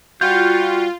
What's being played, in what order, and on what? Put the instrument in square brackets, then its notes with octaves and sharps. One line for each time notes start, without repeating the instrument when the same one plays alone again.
[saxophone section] G3 F#4 [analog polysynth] F4 [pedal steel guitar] G6